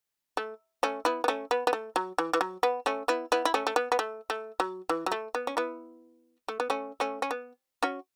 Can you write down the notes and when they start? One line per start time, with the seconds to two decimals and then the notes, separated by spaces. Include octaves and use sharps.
0.37 A3
0.83 A3 C#4
1.05 B3 E4
1.24 B3
1.28 A3 C#4
1.51 B3
1.67 B3
1.73 A3
1.96 F#3
2.18 E3
2.33 E3
2.41 F#3
2.63 B3
2.86 A3 C#4
3.08 B3 E4
3.32 B3 E4
3.45 E4
3.54 A3 C#4
3.67 A3
3.76 B3
3.92 B3
3.99 A3
4.30 A3
4.60 F#3
4.89 E3
5.06 F#3
5.12 A3
5.35 B3
5.47 C#4
5.57 B3 E4
6.48 A3
6.60 B3
6.70 A3 C#4
7.00 A3 C#4
7.22 C#4
7.31 B3
7.83 C#4 F#4